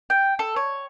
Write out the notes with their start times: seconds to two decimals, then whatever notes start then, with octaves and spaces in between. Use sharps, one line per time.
0.10 G5
0.39 A4
0.56 C#5